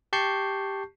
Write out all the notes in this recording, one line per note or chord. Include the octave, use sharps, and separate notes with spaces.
G4 A5 C#6 G6 C7